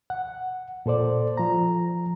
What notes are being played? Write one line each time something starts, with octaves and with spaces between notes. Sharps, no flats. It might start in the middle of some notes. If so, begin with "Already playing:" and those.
F#5
A#2 A4 C5 D5
F3 A#5